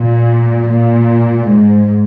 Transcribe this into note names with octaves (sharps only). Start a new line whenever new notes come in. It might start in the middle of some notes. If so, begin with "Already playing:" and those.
Already playing: A#2
A#2
G#2